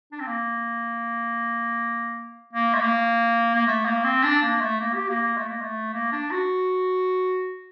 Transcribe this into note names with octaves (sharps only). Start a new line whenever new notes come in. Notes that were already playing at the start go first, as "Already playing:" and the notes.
D4
C4
A#3
A#3
A3
A#3
A#3
A3
A#3
C4
D4
A#3
A3
A#3
G4
A#3
A#3
A3
A#3
A3
A#3
D4
F#4